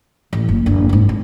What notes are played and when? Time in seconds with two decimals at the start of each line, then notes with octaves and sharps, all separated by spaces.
0.33 A1
0.49 F#1
0.66 F#1 D4
0.89 G#2 C4
1.09 C4